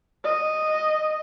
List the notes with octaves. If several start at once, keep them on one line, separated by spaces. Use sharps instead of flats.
D#5